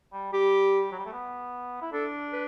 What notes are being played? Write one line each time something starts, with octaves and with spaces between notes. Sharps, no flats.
G3
G3 G4
F#3
G3
A3
B3
E4
D4 A4
B4